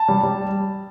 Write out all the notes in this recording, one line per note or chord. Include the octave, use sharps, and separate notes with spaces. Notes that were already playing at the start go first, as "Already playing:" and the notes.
Already playing: A5
G3
G3